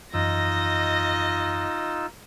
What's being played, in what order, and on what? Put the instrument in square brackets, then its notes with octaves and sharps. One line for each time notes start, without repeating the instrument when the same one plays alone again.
[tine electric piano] F#2 E3 [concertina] D#4 F4 E6 [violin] D#5 A#6